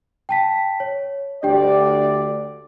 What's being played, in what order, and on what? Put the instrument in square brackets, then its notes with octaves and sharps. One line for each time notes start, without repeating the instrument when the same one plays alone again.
[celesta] G5 A5 B6
C#5
[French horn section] D2 D5 [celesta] D4 G4 G5